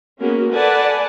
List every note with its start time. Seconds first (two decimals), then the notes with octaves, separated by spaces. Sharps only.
0.21 G#3 A#3 B3 C#4 F#4 A#4
0.53 A4 B4 D5 F#5 G#5 A5